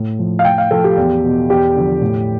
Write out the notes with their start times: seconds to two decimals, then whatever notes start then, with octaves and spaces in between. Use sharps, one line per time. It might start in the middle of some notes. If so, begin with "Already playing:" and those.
Already playing: A2
0.19 F3
0.39 F5
0.44 A2 G5
0.58 F5
0.71 F3 A4
0.84 G4
0.97 E2
1.24 B2
1.49 E2 G4
1.76 D3 F3
2.01 A2